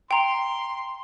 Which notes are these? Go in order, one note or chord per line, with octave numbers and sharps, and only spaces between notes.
G5 A#5 C6